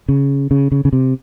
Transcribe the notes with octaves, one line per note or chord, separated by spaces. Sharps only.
C#3
C#3
C#3
C#3
C3